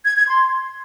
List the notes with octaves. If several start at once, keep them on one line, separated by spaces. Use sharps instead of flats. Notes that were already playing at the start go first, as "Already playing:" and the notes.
G#6
G#6
C6